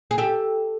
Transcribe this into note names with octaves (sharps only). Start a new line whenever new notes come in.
G#4
G4 A4